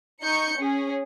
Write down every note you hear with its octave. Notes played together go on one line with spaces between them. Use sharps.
D#4 C#6 G6 C#7
C#4 G#4